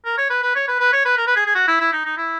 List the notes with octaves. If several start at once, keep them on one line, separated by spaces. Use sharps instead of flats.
A#4
C#5
B4
B4
C#5
B4
B4
C#5
B4
A#4
B4
G#4
G#4
F#4
E4
E4
D#4
D#4
E4